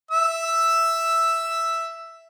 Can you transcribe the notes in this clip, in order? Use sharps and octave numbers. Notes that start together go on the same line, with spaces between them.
E5 E6